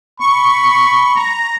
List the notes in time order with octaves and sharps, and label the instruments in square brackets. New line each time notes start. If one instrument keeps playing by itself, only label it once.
[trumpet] B5 [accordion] C#6
[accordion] A#5